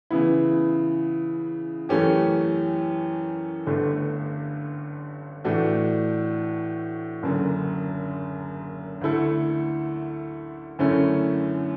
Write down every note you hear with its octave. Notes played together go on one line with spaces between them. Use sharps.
C#3 E3 B3 E4
F#2 E3 A3 C#4 G4
G1 G2 D3 A3
A2 E3 A3 D4 F#4
F#1 F#2 D3
D2 D3 A3 E4 A4
F#2 D3 A3 C#4 E4